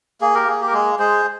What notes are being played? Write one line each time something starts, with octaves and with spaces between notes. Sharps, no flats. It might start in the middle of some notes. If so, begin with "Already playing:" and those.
A#3 G#4
G4 A#4
A#3 G#4
G4
A#4
G#3 G#4
G#3 G#4 C5